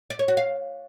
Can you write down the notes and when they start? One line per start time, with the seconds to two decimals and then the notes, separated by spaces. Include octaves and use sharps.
0.10 D5
0.19 C#5
0.28 F#4
0.37 F5